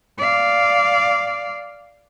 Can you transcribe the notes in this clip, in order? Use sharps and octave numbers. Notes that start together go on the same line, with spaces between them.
D5 F5